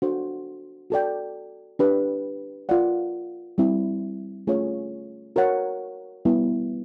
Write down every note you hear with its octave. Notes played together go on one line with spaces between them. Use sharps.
D4 F#4 A4 C5
F#4 A4 D5 G5
D4 G4 B4
F4 A#4 D5 F#5
G3 C4 E4
A3 C#4 F4 G#4 C#5
F#4 A#4 C#5 F#5
G3 B3 E4